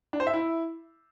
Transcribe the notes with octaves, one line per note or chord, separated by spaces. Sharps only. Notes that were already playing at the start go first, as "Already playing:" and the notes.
D4
C5
E5
E4